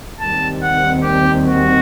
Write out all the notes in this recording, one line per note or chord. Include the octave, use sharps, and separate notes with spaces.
D#2 D#3 G3 C4 A5
F#5
G4
F#4